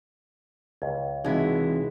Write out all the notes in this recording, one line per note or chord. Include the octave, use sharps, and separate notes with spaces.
C#2 D#5
C3 E3 G#3 D#4 E4 F#4 D#5 E5